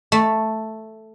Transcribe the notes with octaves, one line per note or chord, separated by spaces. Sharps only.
A3